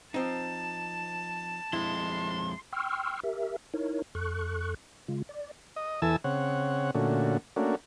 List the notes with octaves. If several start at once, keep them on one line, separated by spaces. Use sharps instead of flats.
F3 C4 D#4 A5
F2 G#3 E4 C6
G5 C6 C#6 E6 F6
G4 A#4 E5
D#4 E4 A#4 C#5
F2 A4 C#6 F#6
C#3 G#3 F4
D5
D#5
E2 E3 A4 G#5 A5 E6
C#3 C4 C#5 F#5
A#2 D3 A3 C#4 F#4
A3 A#3 C#4 D4 F#4